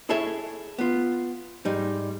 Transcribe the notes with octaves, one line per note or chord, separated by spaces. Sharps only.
E4 G#4 A4 C#5 E5
B3 F4
G#2 G3 D#4